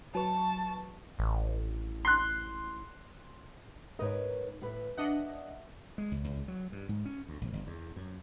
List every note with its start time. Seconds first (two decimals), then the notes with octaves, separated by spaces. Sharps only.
0.15 F#3 B4 A5 C#6
1.19 A1
2.05 C6 F#6
3.99 G#2 D#4 A#4 B4 C#5
4.62 A2 B4
4.98 D4 D#5 E5 F#5
5.98 G#3
6.12 C#2
6.24 C#2
6.48 F#3
6.72 G2
6.89 G#2
7.05 C#4
7.28 D2
7.41 A#1
7.53 G1
7.67 E2
7.96 F#2